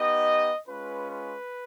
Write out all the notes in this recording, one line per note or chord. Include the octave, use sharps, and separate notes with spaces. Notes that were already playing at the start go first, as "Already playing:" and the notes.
Already playing: B3 D#4 G4 D#5
G#3 C#4 F4 B4
B4